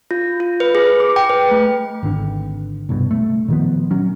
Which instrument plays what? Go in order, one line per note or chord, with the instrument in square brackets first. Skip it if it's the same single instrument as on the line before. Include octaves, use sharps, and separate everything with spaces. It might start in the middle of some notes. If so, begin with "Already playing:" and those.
[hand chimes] F4
F4
B4
G#4
D6
G5
B4
A3
[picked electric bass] G#1 D3
C2 G2 B2
A3
A#2 D#3 F3 B3
F#3 C#4